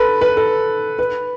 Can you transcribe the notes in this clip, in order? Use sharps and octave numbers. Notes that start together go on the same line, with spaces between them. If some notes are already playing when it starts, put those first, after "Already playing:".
Already playing: A4 B4
B4
A4
B4